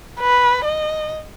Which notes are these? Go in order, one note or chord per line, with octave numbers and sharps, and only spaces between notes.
B4
D#5